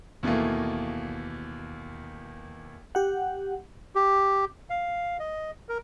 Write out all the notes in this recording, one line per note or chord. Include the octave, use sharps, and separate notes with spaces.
D#2 B2 E3 A3 A#3
G4 F#5
G4
F5
D#5
A#4